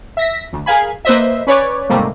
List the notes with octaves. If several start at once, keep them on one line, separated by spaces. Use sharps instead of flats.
E5 A#6 B6
D2
G#4 A#4 F5 G#5 B5
A#3 B4 C5 D#5 E5
C#4 B4 C#5 D5
G#2 C3 D#3 G3 A3 A#3